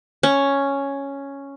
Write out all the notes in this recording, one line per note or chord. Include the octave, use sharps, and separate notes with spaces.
C#4